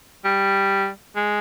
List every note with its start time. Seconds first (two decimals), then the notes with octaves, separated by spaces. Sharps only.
0.25 G3
1.16 G#3